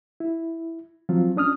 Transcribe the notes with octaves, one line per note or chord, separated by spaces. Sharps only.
E4
F3 F#3 C4 F4
C#4 D4 D#6 F6